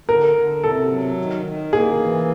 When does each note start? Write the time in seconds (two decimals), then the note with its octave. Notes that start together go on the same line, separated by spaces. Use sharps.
0.08 D3 A#4
0.36 D3
0.64 C3 A4
0.90 F#3
1.18 D#3
1.46 D#3
1.73 A#3 G#4
2.00 E3